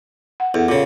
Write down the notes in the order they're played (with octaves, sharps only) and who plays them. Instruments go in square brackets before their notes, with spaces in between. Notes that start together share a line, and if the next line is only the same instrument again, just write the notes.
[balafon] F#5
[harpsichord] E2 [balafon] A4 F#5
[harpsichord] A#2 C#3 [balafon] A4 D6